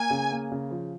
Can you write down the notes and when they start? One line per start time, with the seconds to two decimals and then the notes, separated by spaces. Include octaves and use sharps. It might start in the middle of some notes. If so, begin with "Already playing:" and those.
Already playing: A#3 G#5
0.10 C#3
0.31 A#3
0.51 C#3
0.71 F3